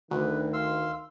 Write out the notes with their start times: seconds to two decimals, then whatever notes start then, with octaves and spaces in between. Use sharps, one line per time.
0.11 D2 D#3 B4
0.53 F5 C6 E6